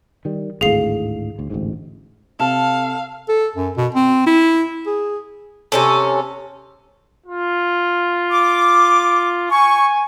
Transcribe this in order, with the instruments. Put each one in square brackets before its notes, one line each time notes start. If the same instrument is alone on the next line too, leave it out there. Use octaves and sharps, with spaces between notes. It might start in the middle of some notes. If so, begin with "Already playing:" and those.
[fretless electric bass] D#3 G3
[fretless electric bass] G#1 D2 A2 [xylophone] G#4 F5 C7
[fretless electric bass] D2
A1 D2 G#2
[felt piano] C3 [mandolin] A4 [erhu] F5
[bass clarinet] A4
F#2
B2
C4
E4
G#4
[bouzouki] C3 C#4 A4
[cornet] F4
[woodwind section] D6
[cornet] G#5 [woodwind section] C#6